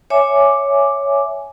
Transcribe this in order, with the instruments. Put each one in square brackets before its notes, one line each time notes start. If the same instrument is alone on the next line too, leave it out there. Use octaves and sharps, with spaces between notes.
[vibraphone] C#5 E5 G#5 D6